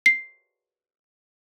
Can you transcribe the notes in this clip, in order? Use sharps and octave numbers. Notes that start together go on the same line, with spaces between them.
C7